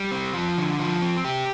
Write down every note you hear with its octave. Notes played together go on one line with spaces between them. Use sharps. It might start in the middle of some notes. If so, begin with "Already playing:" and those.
Already playing: G3
C4
F3
D3
F3
C4
G4